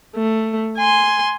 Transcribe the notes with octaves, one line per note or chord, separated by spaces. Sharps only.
A3
G#5 C6